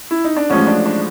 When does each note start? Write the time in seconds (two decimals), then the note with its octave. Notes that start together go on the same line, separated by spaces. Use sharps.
0.11 E4
0.25 D#4
0.37 D4
0.50 A1 A2 F3 G#3 C#4
0.67 D4
0.86 D4